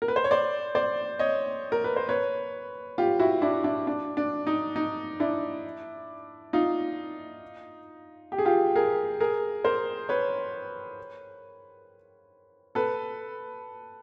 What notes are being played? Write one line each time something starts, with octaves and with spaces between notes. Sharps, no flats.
A#4
B4
C5
C#5
C5 D5
C5 D5
C#5 D#5
A#4
B4
C5
B4 C#5
F4 G4
E4 F#4
D4 E4
D4 E4
D4
D4
D#4
D#4
D4 E4
D#4 F4
G4
G#4
F4 G4
G#4 A#4
G#4 A#4
A#4 C5
B4 C#5
A4 B4